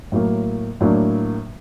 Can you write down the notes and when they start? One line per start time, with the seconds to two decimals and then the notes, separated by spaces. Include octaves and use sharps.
0.12 A2 F#3 A#3
0.81 A2 F#3 A#3 D4